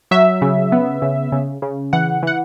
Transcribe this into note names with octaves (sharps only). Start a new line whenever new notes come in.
F#3 E5
C#3
B3
C#3
C#3
C#3
E3 F#5
E3 F#5